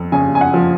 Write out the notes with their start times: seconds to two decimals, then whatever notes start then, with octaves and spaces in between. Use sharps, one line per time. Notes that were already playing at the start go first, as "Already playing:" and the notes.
Already playing: F2
0.12 C#3 G#5
0.35 G#5
0.41 F#5
0.54 F3